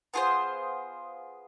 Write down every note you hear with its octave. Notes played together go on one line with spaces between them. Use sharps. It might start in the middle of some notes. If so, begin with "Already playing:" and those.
B3 F4 G#4 C5